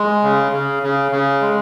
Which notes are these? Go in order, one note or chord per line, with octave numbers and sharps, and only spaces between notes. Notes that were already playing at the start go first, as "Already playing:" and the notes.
Already playing: G#3
C#3
C#3
C#3
C#3
G#3